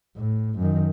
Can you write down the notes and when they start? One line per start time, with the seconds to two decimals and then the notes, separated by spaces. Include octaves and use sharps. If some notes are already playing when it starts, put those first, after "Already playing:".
0.17 A2
0.58 F#2 D#3